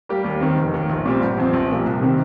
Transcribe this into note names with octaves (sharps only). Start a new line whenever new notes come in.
G3 A#3 G4
D#2
D#3 C4
F1
D#2 D#3
A#1
A#2 G3 C4 G4
G1
F2 F3 C4
A#1
A#2 F3 A#3 G4
C2
C3 D#3 C4 G4